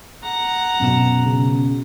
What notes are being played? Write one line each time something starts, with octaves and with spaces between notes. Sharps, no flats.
F#5 A#5
F#2 B2 E7
C#3